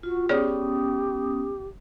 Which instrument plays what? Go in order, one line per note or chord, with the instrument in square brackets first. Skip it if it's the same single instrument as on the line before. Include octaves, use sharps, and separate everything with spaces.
[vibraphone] F4 [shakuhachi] F#4
[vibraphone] B3 C#4 D#6 [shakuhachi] G4 [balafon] G#4 C#5 D5